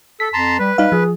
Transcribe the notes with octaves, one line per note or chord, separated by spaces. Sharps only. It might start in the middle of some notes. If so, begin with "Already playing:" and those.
A4 B6
F2 A5 A#5 C6
G3 B4
G3 D#4 B4 F5
F3 G#4